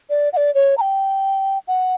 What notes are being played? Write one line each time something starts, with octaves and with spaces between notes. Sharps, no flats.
D5
F#5
D5
C#5
A#5
G5
F#5